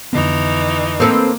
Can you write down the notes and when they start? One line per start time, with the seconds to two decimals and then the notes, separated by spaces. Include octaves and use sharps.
0.13 F2 D3 E3 B3 D#4
1.00 A#3 C4 A4 B4